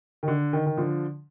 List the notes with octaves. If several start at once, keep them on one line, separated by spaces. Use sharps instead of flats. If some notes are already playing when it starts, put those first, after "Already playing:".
D#3
D3
D#3
D#3
D3 F3